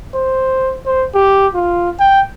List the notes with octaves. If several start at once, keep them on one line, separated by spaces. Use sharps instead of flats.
C5
C5
G4
F4
G5